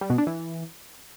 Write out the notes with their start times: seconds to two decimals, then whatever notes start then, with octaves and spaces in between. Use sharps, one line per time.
0.01 G3
0.10 B2
0.18 D4
0.27 E3